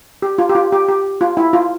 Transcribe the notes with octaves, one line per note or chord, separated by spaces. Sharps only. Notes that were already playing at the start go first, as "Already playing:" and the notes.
G4
F4
G4
F4
G4
G4
F4
E4
F4